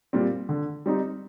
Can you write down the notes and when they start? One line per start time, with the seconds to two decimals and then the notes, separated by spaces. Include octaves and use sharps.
0.13 A#2 G3 C4
0.49 D3
0.86 G3 C4 D#4